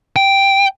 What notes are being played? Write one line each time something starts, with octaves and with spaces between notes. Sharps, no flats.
G5